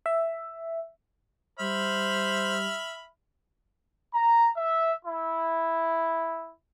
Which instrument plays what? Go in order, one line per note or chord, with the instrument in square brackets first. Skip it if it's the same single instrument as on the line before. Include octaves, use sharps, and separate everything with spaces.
[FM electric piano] E5
[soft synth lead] G3 [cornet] C5 [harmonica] E5 B5 F6
[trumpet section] A#5
E5
E4